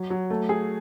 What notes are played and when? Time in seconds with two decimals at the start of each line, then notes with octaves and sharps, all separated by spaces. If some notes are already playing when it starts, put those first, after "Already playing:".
Already playing: F#3
0.10 F#3
0.30 A3
0.49 G#4